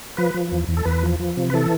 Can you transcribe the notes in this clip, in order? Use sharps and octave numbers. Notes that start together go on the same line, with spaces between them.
F3 B4
F3
E2
E2
A4
E2 B4
F3
F3
C3
B4
E3 A4